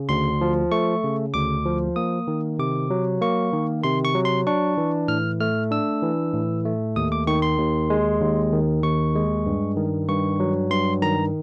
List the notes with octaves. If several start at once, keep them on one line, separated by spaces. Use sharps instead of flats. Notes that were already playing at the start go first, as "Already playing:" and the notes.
Already playing: C#3
D2 C6
F3
A3 C#6
C#3
D2 D6
F3
A#3 D#6
D#3
C3 D6
F#3
A#3 C#6
D#3
C3 C6
C#6
F#3
C6
D4 C#6
E3
A2 F6
A3 F6
D4 E6
E3
A2
A3
D#2 D#6
D6
D#3 C#6
C6
D#2
G#3
D#2
D#3
D#2 C#6
G#3
G2
D#3
G2 C#6
F#3
G2 C6
D#3 A#5